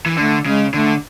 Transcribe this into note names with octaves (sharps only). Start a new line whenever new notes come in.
E3
D3 A3
C#3 G#3
D3 A3